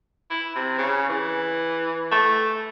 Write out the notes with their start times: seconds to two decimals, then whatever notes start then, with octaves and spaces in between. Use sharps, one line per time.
0.30 E4
0.55 C3
0.78 C#3
1.09 E3
2.12 A3